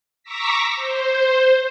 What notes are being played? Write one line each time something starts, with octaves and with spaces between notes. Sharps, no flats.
A#5 C#6 D6 E6 A#6 B6
C5